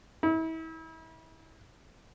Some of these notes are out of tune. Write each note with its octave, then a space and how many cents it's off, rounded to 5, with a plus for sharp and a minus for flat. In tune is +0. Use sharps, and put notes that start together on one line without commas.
E4 -35